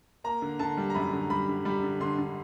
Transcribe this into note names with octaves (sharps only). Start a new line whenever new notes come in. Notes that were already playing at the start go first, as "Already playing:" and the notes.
A#3 A#5
D3
D3 A5
G3
A#5
F#2 B5
D3
G3 B5
D3
G3 B5
D3
D3 C6
D3